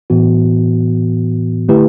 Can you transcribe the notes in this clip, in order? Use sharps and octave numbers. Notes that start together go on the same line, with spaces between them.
A2 E3 B3 F#4
D3 A3 E4 G4 B4